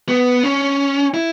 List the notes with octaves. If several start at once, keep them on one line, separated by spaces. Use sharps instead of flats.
B3
C#4
E4